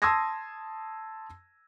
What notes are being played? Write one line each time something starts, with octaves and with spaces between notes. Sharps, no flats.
A5 C6 D#6 E6 G#6 A#6